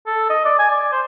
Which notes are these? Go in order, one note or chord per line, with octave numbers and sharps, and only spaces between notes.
A4
D#5
D5
G#5
D5
C5